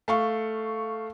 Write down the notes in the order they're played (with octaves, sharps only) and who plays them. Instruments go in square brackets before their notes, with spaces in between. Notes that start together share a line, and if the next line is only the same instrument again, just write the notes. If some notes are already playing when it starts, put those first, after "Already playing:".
[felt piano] A3 F5 C#6